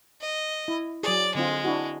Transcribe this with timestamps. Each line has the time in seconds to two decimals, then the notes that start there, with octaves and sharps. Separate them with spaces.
0.21 D#5
0.68 E4
1.03 F#3 G#4 D5
1.35 D3 G#3 C4 F4
1.64 D4 E4 F#4